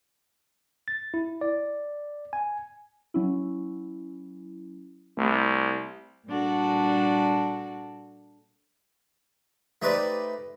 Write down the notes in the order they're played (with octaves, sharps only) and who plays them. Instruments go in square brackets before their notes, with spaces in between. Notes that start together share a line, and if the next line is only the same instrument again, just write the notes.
[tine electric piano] A6
E4
D5
G#5
[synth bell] F#3 C#4 E4
[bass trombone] C2 [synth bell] A3
[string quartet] A#2 G3 D4 F#4 A4
[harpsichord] A3 D#4 G4 B4 C5 D5